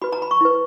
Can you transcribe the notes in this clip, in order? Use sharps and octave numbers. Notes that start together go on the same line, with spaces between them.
F#4 B4 B5
A#5
B5
C#6
E4 B4